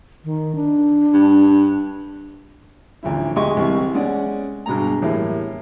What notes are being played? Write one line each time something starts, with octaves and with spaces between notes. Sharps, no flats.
D#3
D4
G2
A1 D2 F3 E4
D2 G#3 G4 D#5 C6 C#6
C2 E3 G4
G#3 C#4 D5 F#5
G2 B2 G#3 A#5
E2 A2 G3 A#3